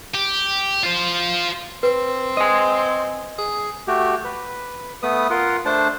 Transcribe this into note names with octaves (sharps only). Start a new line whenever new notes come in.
G4
F4 C5
C4 B4
D#5 G#5
G#4
A3 F#4 G4
B4
A3 B3 B4 D#6
F4 A#4 F#5
A3 D4 C5 A5